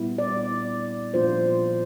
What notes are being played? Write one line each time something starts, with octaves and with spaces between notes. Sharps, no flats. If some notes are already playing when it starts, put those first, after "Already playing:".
Already playing: A#2 G3 B3 E4
D5
A#2 F3 A#3 D4 F4 C5